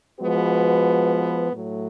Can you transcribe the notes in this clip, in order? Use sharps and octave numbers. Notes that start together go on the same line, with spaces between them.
F3 G#3 B3 F#4 B4
A2 F#3 A3